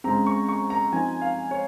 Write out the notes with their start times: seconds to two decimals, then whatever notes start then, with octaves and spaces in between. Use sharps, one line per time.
0.04 C#3 G#3 C4 A#5
0.26 C#6
0.49 C#6
0.70 A#5
0.92 F3 C4 D#4 G#5
1.22 F5
1.51 C#5